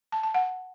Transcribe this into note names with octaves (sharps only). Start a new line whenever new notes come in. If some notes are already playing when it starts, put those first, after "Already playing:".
A5
A5
F#5